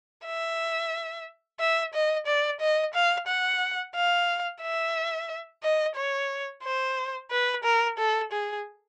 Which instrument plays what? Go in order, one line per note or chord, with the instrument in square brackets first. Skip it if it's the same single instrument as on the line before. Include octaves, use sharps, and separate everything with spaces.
[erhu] E5
E5
D#5
D5
D#5
F5
F#5
F5
E5
D#5
C#5
C5
B4
A#4
A4
G#4